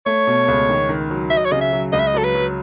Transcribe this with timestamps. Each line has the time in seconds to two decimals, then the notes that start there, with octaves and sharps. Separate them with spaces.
0.06 A3 C#5
0.27 B2
0.48 C#2
0.69 D#3
0.89 D#3
1.10 F#3
1.30 F#3 E5
1.37 D#5
1.45 C#5
1.52 C#3 D#5
1.61 E5
1.73 F#3
1.93 C#2 D#5
2.00 E5
2.07 D#5
2.14 F#3 A4
2.24 B4
2.35 F#3